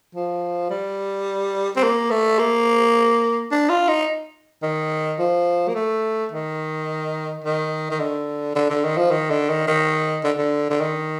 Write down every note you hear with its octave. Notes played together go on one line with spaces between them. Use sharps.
F3
G3
C4
A#3
A3
A#3
D4
F4
D#4
D#3
F3
A#3
A3
D#3
D#3
D#3
D3
D3
D3
D#3
F3
D#3
D3
D#3
D#3
D3
D3
D3
D#3